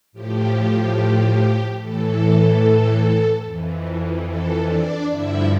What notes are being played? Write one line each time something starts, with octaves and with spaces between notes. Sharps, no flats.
A2 F3 G4
A2 E3 A4
F2 E3
A4
D4 D5
G2 D3 F3 E4 E5